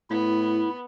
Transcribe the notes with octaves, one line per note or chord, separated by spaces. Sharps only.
A2 B3 E4